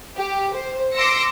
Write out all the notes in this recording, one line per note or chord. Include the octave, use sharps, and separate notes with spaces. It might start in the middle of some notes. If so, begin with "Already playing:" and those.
G4
C5
C6 D6 E6 A#6 C#7